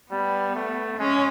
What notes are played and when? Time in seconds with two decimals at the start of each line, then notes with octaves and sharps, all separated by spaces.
0.11 G3 B3
0.55 A3
0.98 G#3 C#4